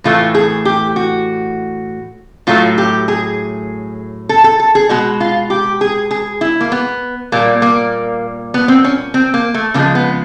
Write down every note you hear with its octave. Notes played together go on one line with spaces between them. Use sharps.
A2 E3 A3 F4
G#4
G4
F#4
A2 F#3 A3 F4
G4
G#4
A4
A4
A4
G#4
B2 G#3 F#4
F4
G4
G#4
G#4
E4
A#3
B3
A#2 G3 A#3
A#3
B3
C4
C#4
C4
A#3
A3
C#3 F3 G#3 A#3
B3